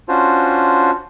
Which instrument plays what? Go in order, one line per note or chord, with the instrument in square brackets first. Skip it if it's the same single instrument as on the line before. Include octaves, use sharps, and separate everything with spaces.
[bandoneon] C#4 D4 F4 F#4 C5